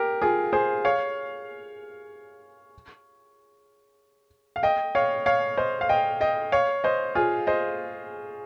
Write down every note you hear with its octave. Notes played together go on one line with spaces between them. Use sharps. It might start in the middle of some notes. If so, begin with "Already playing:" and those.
Already playing: G4 A#4
F4 G#4
G#4 C5
C#5 F5
F5
D#5 G5
C#5 F5
C#5 F5
C5 D#5
F5
D#5 G5
D#5 G5
C#5 F5
C5 D#5
F4 G#4
C5 D#5